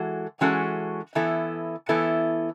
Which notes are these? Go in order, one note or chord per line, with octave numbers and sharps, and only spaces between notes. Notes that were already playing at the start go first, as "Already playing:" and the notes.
Already playing: E3 G#3 F#4 A4
E3 G#3 C#4 F#4 A4
E3 B3 E4 A4
E3 B3 E4 A4